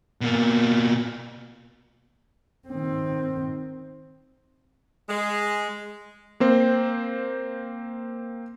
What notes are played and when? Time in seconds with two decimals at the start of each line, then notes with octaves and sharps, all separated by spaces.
0.21 B2 A#3
2.68 D#3 C4
5.09 G#3
6.40 A#3 C4 C5